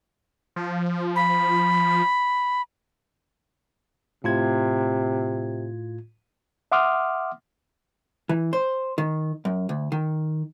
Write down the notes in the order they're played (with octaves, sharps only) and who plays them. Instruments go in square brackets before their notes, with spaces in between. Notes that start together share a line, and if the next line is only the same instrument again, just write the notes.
[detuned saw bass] F3
[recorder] B5
[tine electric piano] A2 F4 G#6 [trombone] C3
[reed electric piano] E5 F#5 C6 D6 D#6 F6
[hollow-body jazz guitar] E3
C5
D#3
F#2
D2
D#3